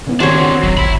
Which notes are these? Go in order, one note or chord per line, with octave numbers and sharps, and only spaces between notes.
C#3 B3 E4
D#3 C4 D4 F#4 G4 C5 C#5
F#4
D1 F#3
G1 E5 B5